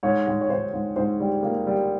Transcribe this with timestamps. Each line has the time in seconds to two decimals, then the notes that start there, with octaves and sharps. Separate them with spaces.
0.03 G#2 C#5
0.27 G#2
0.41 C#5
0.50 G#2 C5
0.73 G#2
0.96 G#2 C5
1.20 G3
1.43 A#3
1.67 G3